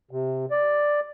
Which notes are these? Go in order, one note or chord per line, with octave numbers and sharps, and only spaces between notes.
C3
D5